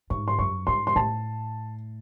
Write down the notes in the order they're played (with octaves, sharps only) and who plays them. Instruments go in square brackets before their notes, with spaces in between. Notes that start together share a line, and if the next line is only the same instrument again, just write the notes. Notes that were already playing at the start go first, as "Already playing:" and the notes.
[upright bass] G#2 [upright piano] C#6
[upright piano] C6
[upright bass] F#2 [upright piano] C#6
[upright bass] G#2 [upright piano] C6
[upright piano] C6
[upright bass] A2 [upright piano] A5